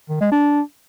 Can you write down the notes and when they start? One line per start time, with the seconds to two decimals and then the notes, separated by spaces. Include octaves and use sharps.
0.09 D#3
0.21 G#3
0.32 D4